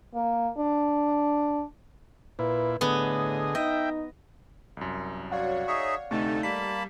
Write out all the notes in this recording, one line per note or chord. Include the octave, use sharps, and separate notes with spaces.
A#3
D4
A#2 E4 B4
A2 D3 B3 G#4 D#5
D#4 D#5 E5 G5
C2 F#2
F#4 C#5 D5 F5 F#5
D#4 G#4 C#5 E5 C#6
D2 C3 A3 D#4 A4 C#6
G3 A#3 A5 B5 B6